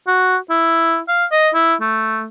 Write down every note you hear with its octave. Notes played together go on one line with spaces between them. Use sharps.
F#4
E4
F5
D#5
E4
A3